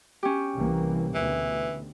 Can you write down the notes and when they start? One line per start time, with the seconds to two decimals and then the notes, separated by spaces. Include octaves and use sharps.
0.23 C#4 G4
0.56 C2 E3 A#3
1.15 D2 B2 E3